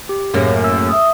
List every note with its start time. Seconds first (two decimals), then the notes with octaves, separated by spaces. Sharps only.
0.09 G4
0.34 F#2 A2 C#3 A#3
0.64 E6
0.89 E5 D#6